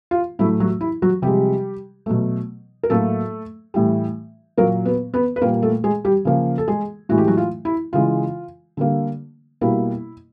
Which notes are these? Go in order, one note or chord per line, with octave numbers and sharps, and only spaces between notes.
F4
A2 F#3 A3 E4
F#3 F#4
E4
F#3 F#4
C3 F3 G3 G#3 G4
B2 F#3 A3
A#4
A2 F#3 A3 A#3 A4
A2 E3 G3
A#2 F#3 A#3 A#4
B3 B4
B3 B4
B4
A#2 G3 A#3 A#4
A3 A4
G#3 G#4
G3 G4
C#3 F3 A#3
A4
G#3 G#4
A2 E3 G#3 F#4
G4
F#3 F#4
F4
E4
C#3 E3 G#3 F4
D3 G3 A#3
B2 G3 A#3 E4